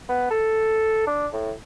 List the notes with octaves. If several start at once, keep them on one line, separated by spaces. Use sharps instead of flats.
B3
A4
D4
A2